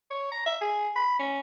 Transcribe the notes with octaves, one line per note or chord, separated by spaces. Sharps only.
C#5
A#5
E5
G#4
B5
C#4